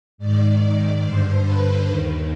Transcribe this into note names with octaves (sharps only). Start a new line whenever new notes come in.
G#2 D#3 D5
D5
G2 D3 C5
B4
D#2 D#3